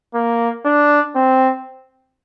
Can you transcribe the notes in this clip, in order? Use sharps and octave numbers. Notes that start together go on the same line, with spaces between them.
A#3
D4
C4